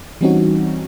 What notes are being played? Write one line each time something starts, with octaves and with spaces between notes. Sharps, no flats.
E3 G3 C4 C#4 D#4 F#4